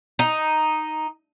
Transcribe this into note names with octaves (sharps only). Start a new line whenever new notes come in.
D#4